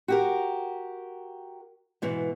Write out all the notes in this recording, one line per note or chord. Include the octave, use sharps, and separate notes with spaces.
F#4 G4 A#4
G#2 B2 E3